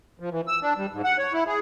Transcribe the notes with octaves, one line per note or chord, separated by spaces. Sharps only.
F3
E3
E6
D4
G3
G#2
F#5
C#5
E4
G#4